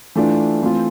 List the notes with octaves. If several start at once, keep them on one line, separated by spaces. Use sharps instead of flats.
E3 A3 D4 F4
E3 A3 C4 F4